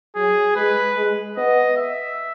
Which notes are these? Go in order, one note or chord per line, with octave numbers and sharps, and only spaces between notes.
F#3 G#4
G#3 B4
G#3
B3 D#5
E5